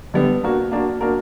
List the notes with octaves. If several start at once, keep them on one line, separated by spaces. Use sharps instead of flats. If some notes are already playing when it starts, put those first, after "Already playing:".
D3 G3 B3 D4
A#3 D4 F#4 A#4
A#3 D4 F#4 A#4
A#3 D4 F#4 A#4